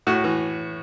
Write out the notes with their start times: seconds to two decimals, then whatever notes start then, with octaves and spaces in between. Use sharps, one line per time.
0.07 A2 F#4
0.24 E3